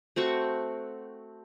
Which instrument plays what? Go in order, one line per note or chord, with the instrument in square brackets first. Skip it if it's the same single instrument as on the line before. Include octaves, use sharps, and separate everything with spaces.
[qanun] A3 C4 F#4 C#6